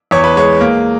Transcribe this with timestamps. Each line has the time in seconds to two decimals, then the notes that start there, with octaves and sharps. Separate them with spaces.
0.11 E2 C#5
0.24 B4
0.36 G#3 C#5
0.60 A#3